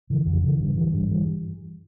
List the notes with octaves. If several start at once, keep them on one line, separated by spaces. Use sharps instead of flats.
C#3 E3
F2
C#3 E3
G2
E3 G3
G2
E3 G3